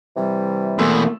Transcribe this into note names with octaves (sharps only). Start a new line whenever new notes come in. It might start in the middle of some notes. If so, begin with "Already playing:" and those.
C3 E3 G3
E2 B2 A3 A#3 C6 E6